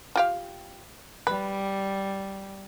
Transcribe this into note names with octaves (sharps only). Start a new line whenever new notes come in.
F4 G4 F5
G3 B4